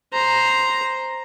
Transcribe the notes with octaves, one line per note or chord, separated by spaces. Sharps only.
C5 A#5